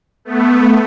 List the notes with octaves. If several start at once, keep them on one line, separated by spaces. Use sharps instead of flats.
A3 B3